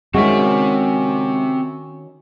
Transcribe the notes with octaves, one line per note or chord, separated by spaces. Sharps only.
D#3 G#3 C4 C#4 F#4 E5